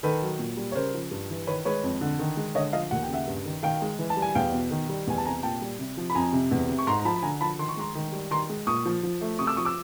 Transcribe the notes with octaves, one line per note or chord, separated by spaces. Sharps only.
D#3 A4 B4
F#3
A#2
G3
C#5
C#3 A#4 C5
F3
G2
E3
D#3 B4 C#5
G#3 B4 C#5
F2
D3
D#3
G#3
D3 C#5 D#5
F3 D#5 F5
D#2 F#5
G5
C#3 E5 F#5
G2
D#3
D#3 F5 G5
G#3
E3
A5
G3
G#5
E2 F5 G5
B2
D#3
G3
E2 G#5
A5
C3 G#5 A#5
A#2 G5 A5
G3
C3
F3
B5
F2 G#5 A#5
C3
E2
C3
C#6
G#2 A#5 C6
A#5
F3 A5 B5
B5
D3 G#5 A#5
F3 A5 B5
D#3 C6
C#6
G#3 A#5 C6
D#3
G3
D#3 A#5 C6
G#3
A#2 C#6 D#6
F3
F3
A3
C3 C#6 D#6
D6 E6
F3 C#6 D#6
D6 E6